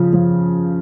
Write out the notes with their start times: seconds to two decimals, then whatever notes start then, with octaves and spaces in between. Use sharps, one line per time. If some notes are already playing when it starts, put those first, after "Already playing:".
Already playing: C#3 F3
0.13 F3